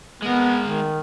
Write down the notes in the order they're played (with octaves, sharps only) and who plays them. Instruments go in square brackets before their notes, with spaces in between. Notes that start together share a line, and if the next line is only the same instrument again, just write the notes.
[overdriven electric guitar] G#3 A#4 [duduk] B3
[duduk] D#3